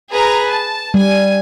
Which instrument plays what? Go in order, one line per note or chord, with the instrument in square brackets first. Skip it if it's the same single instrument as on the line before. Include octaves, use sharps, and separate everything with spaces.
[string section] G#4 B4 A#5
A5
[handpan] G3 [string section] G#5